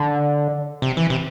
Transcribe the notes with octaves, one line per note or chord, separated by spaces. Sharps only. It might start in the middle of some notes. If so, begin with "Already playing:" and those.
Already playing: D3
C3
E3
C3